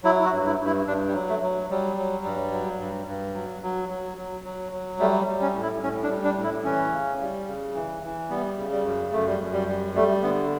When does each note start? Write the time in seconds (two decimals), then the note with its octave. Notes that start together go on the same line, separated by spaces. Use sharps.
0.04 F#3 E4
0.20 E4
0.25 F#4
0.32 G2
0.46 E4
0.59 G2
0.66 E4
0.87 G2 D4
1.08 G3
1.14 F#3
1.29 A3
1.42 F#3
1.70 F#3 G3
1.97 F#3
2.25 G2
2.52 F#3
2.80 G2
3.07 G2
3.34 F#3
3.62 F#3
3.89 F#3
4.18 F#3
4.45 F#3
4.72 F#3
4.99 G3 A3
5.27 G3
5.41 C#4
5.54 A2
5.62 E4
5.83 A2 C#4
6.03 D4
6.09 G3
6.24 D4
6.38 A2
6.44 E4
6.65 E3 C#4
6.92 C#3
7.21 G3
7.47 C#3
7.75 E3
8.03 E3
8.29 G3 B3
8.58 C#3
8.72 G3
8.85 F#2
9.12 F#2 A3
9.26 G3
9.40 F#2
9.52 G3
9.68 G3
9.95 G3 A3
10.22 D3 B3